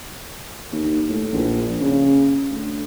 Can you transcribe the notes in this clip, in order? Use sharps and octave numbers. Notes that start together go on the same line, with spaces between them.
D#2
A2
A#1
C#3
D2